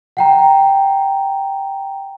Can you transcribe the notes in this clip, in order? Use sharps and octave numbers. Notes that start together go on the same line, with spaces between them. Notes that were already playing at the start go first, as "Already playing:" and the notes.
F#5 G5 A#5